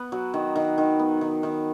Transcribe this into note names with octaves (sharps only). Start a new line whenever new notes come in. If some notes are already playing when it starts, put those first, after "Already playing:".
Already playing: B3
F#3
D#3
D#3
D#3
B3
D#3
D#3